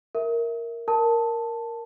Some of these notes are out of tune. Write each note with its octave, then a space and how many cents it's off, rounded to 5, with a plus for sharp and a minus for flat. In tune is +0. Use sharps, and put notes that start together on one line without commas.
A#4 +0 E5 -10
A#4 +0 A5 +0